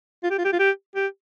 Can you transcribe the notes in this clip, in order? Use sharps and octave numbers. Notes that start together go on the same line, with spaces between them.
F4
G4
F4
G4
F4
G4
G4